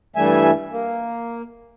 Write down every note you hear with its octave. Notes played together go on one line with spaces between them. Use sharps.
G2 E3 G3 A3 E5 G#5
A#3